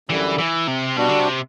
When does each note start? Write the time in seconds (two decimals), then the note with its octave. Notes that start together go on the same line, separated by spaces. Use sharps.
0.09 F#2 D3 E3 G3
0.38 E3
0.67 C3
0.97 B2 G3 D4 F#4
1.09 D3
1.20 C3